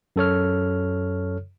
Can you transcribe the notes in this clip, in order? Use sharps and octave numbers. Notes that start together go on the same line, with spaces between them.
F#2 A4 C#5 F6